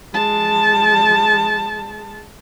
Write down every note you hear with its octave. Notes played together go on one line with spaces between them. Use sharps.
G#3 A5